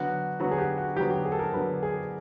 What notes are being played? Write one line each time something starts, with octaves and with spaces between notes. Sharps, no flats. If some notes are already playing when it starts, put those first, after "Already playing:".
Already playing: D3 F#3 B3 F#4
D3 F#3 B3 F#4
G#4
G4
F#4
D3 F#3 B3 G4
G4
G#4
A4
A#4
D3 F#3 B3 B4
G#4